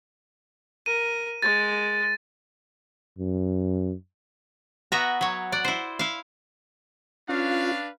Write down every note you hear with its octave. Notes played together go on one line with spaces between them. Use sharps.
A#4 D#7
G#3 A6
F#2
B3 F#4 E5 F#5 A#5
F#3 C#5
D5 F#5
E4 C5
E4 F5
C#4 D4 F4 B4 F5